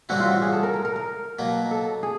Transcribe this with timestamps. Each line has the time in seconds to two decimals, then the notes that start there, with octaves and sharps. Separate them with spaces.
0.09 A2 E3 G3 C4 E4 F#4
0.20 F4
0.31 F#4
0.42 G#4
0.52 A4
0.63 A#4
0.74 A#4
0.85 A#4
0.96 A#4
1.39 B2 F#3 A#3
1.71 A4
2.03 G#4